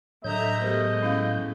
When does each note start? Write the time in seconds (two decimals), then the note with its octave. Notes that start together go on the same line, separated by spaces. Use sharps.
0.24 A2 D3 F#3 D#5 E5 A#5 G6
0.61 G#3 A3 B3 G4 A#4 C5
1.02 C#4 E4 F5